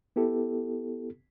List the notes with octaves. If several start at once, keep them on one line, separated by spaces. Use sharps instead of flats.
B3 E4 G4 A4